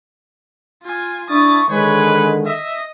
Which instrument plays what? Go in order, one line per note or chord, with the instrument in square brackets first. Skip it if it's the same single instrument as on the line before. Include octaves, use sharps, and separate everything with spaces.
[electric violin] F4 G#5
[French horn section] D4 [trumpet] E4 [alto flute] C#6 [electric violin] D#6 A6
[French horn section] D3 D#3 [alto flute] G#3 [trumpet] B4 [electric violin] C#5
[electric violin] D#5 [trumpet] E5